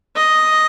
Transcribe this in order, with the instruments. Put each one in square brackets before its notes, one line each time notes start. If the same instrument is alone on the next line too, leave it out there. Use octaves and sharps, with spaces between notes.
[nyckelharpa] D#5